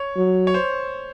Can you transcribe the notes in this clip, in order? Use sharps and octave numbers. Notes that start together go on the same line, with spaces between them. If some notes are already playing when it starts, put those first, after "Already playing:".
Already playing: C#5
F#3
C#5
C5